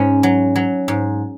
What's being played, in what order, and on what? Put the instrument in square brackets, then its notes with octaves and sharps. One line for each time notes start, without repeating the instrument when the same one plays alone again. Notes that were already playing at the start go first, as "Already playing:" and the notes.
Already playing: [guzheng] G#2 C#4
F#3
F#3
G#2